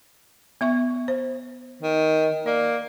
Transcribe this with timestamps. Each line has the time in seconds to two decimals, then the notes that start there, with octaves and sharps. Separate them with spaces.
0.61 B3 E5 C#6
1.08 C5
1.82 D#3
2.46 A#3 D5